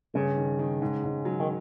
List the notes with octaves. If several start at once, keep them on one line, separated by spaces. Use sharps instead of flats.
G2 C#3
D#3
D#3
G#2
G#2
F#3
D#3